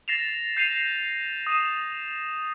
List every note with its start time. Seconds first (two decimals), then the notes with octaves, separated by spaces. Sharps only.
0.08 A6 A#6 C7 E7 F7
0.57 G6 C7 D#7 F7
1.47 D#6 D#7 E7